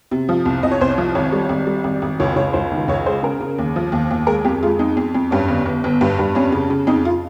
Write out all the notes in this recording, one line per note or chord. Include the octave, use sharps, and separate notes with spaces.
C3
F3
C2
C2 D#5
C#5
C2 C5
C#5
F3
G#1 C#5
G3
G#1
G3
G#1
G#1
C#2 C#5
C#2 C#5
C#2 C5
D#3
C#2 C#5
G#3 C5
C#3 A#4
C#3
D#2
F3
D#2
D#2
G#3 A#4
F2 G4
G#3 F4
F2 D#4
F2
F2
G2 C#4
G1
G1
G1
G2
G2
F2 C#4
C#3
C#3
F2 D#4
F4